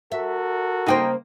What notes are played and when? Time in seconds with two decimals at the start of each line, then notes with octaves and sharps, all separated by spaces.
0.12 F#4 A4 A#4 E5
0.86 C#3 A#3 D#4 C5 D#5 G5